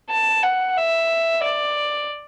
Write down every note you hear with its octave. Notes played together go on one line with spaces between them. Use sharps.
A5
F#5
E5
D5